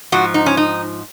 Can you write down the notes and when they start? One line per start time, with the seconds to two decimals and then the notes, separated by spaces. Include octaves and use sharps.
0.12 G#2 F3 F#4
0.34 D#4
0.46 C#4
0.57 D#4